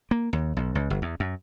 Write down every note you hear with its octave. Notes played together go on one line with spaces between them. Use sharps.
A#3
D#2
B1
C#2
G1
E2
F#2